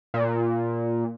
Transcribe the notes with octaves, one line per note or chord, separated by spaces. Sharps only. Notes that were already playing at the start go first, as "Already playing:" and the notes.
A#2